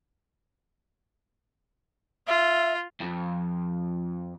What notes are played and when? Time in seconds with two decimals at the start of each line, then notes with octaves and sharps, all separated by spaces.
2.28 F4 E5
3.00 F2